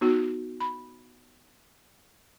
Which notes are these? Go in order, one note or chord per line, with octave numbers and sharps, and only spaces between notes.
B3 D#4 F#4
B5